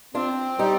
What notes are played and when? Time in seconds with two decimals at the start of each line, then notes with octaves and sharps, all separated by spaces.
0.15 C4 D4 F4
0.59 G3 D#4 G4